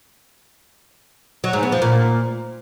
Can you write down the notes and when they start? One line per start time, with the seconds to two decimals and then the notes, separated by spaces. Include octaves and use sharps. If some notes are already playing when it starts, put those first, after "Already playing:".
1.44 F#3
1.53 G#2
1.63 B3
1.72 F3
1.82 A#2